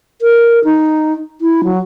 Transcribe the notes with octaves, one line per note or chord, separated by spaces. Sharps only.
A#4
D#4
E4
F#3